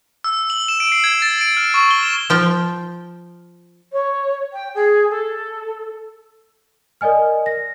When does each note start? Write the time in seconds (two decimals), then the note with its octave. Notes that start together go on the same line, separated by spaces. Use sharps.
0.24 E6
0.50 F#7
0.68 E7
0.80 D7
0.92 C7
1.04 G#6
1.22 A6
1.41 D7
1.57 F6
1.74 C#6
1.91 G7
2.03 E7
2.30 F3 G5
3.92 C#5
4.52 G5
4.74 G#4
5.10 A4
7.01 A#4 D5 D#5 G#5 F6
7.46 A#6